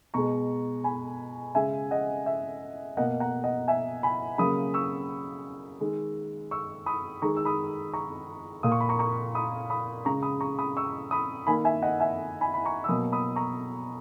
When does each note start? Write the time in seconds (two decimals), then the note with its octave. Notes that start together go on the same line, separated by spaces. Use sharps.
0.14 B2 G#3 A#5 C#6
0.84 G#5 B5
1.55 C#3 G#3 E5 G#5
1.91 D#5 F#5
2.26 E5
2.97 B2 A#3 D#5 F#5
3.20 F#5 A#5
3.44 D#5 F#5
3.68 E5 G#5
4.03 G#5 B5
4.38 C#3 F#3 A#3 B5 D#6
4.74 C#6 E6
5.81 D#3 G#3
6.51 C#6 E6
6.86 B5 D#6
7.22 D#3 G#3 A#5 C#6
7.36 E6
7.45 B5 D#6
7.94 A#5 C#6
8.63 A#2 A#3 D#6
8.72 C#6
8.80 B5
8.89 A#5 C#6
8.99 A#5 C#6
9.35 B5 D#6
9.70 B5 D#6
10.05 C#3 G#3 A#5 C#6
10.23 B5 D#6
10.41 A#5 C#6
10.59 B5 D#6
10.77 C#6 E6
11.11 B5 D#6
11.47 D#3 A#3 G#5 B5
11.65 E5 G#5
11.82 D#5 F#5
12.00 E5 G#5
12.41 G#5 B5
12.54 B5
12.65 A#5 C#6
12.84 E6
12.88 B2 F#3 A#3 B5 D#6
13.12 B5 D#6
13.36 A#5 C#6